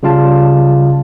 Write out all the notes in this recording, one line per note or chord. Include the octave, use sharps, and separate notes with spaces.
C#3 G3 F4 F5 A5